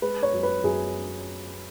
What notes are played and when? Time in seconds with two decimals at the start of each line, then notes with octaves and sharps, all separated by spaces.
0.02 G#3 B4
0.23 C#5
0.33 F#2
0.43 B4
0.64 F#2 G#4